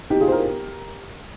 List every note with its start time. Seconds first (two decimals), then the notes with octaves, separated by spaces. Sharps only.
0.10 D#4 G4
0.21 F4 G#4
0.28 C5
0.32 G4 A#4